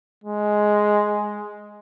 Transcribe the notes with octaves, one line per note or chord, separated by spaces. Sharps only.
G#3